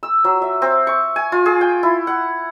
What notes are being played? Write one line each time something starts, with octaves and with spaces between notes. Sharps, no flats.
E6
F#3
E5
C4
C#6
G#5
F4
G#4
G5
E4
F#5